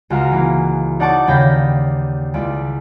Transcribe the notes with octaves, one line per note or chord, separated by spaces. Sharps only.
C#2 F#4 F5 A#5
E3 A#3
D#4 D5 F#5 A5 C#6 D6
D#2 C#3 G5 B5 A#6
C#2 E4 D5